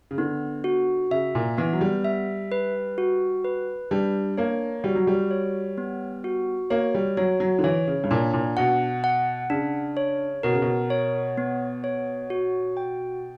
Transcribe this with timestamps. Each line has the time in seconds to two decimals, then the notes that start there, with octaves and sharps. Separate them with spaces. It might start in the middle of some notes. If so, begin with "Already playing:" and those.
0.11 C#3
0.18 D3 B3
0.64 F#4
1.11 C#3 E5
1.35 A#2
1.58 E3 B3
1.73 F#3
1.81 G3
2.05 E5
2.52 B4
2.98 F#4
3.45 B4
3.91 G3 D4
4.37 A#3 C#5
4.84 G3 F#4
4.95 F#3
5.07 G3
5.31 C#5
5.78 B3
6.24 F#4
6.70 A#3 C#5
6.94 G3
7.17 F#3 C#5
7.40 F#3
7.59 D3
7.64 E3 C#5
7.88 C#3
8.04 G2
8.11 A#2 D4
8.33 A#2
8.57 B2 F#5
9.04 F#5
9.50 C#3 D4
9.97 C#5
10.43 B2 A#4
10.53 C#3
10.62 B2
10.90 C#5
11.38 B3
11.84 C#5
12.30 F#4
12.77 G5